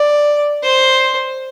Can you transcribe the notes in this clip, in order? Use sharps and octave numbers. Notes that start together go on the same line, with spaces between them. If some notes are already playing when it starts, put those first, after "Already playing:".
Already playing: D5
C5